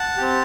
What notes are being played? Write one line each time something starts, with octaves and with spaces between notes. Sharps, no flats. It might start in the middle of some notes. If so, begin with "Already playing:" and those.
Already playing: F#5 A5
C4 G4